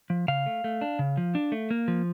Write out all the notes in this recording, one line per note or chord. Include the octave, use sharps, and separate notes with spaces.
F3
C#3 F5
A3
A3
D4
C#3
F3
D4
A3
A#3
F3